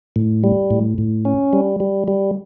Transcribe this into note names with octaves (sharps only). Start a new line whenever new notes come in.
A2
G3
A2
A2
C#4
G3
G3
G3